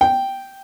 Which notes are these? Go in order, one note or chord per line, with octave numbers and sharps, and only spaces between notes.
G5